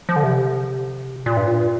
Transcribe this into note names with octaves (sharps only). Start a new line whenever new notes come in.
F3
D3
C3
A#2
G2
A#2